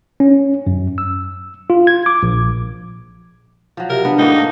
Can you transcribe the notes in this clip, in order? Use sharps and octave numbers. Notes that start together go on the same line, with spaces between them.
C#4
F#2
E6
F4
G#6
D6
A#1
F3 F#3
C3 A#4
B3 D4
A2 E3 A#3 D#4
A#3 A#4